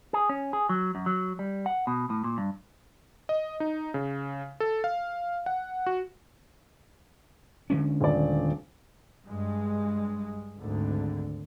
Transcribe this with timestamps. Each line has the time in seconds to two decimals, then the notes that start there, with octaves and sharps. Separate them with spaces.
0.13 G#4
0.29 C#4
0.53 G#4
0.69 F#3
0.95 F#2
1.06 F#3
1.39 G3
1.66 F#5
1.87 B2
2.10 A2
2.24 A#2
2.38 G2
3.29 D#5
3.60 D#4
3.94 C#3
4.60 A4
4.84 F5
5.46 F#5
5.86 F#4
7.70 D3 G#3 C#4
8.00 D#1 D5
9.25 G2 G#3
10.58 G#1 D2 D3